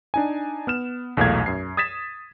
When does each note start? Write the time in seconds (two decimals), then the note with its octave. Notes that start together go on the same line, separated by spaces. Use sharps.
0.14 D4 D#4 G#5
0.67 B3 F6 E7
1.17 B1 E2 A#2 A3 F5 G#6
1.46 F#2 C7
1.77 D#6 G#6 A6 B6 E7